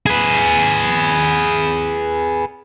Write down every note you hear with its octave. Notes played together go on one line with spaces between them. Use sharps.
G#4 B4